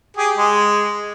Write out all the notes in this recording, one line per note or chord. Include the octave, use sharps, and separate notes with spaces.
G4 G#4
G#3